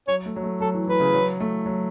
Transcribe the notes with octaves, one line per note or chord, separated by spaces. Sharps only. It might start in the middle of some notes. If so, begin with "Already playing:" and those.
F#3 C#5
A3
F#3
A3
F#3 A4
E3
E3 B4
C#3
F#3
A3
F#3